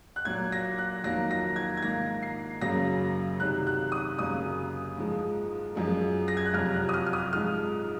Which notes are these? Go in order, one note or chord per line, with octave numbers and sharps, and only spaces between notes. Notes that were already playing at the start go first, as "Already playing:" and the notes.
F#6
A#2 F#3 A#3 G#6
A#6
F#6
F2 D#3 F#3 A#3 A#6
A#6
G#6
G#6
G#2 D#3 A#3 A#6
C7
F#2 C#3 F#3 A#3 A#6
C3 D#3 F#3 F#6
F#6
D#6
F#2 C#3 F#3 A#3 D#6
G#2 F3 G#3
F#2 F3 G#3
A#6
G#6
F#6
F2 C3 F#3 F6
F#6
D#6
F6
F6
D#6
G#2 F3 G#3 F6